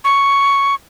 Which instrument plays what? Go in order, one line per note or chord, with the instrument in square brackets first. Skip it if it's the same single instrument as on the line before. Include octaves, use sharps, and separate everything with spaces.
[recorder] C#6